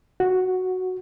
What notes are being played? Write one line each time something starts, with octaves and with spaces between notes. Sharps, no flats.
F#4